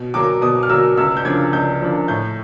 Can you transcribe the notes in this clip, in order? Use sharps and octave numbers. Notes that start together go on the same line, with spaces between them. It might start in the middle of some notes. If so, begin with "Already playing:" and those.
Already playing: B2
F#3 A#3 D6
B2 D#6
F6
F#3 A#3 E6
C#2 E6
G6
C#3 F3 A#3 D4 G#6
C#2 G6
C#3 F3 A#3 D4
A2 G6